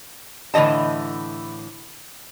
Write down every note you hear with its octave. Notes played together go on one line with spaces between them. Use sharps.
A2 D3 E3 D#5 A5